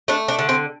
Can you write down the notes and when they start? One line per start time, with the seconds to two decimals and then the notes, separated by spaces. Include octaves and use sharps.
0.08 A3 D4
0.28 D4
0.39 D3
0.49 C4